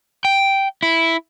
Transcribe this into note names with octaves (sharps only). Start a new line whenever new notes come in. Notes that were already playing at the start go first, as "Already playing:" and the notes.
G5
E4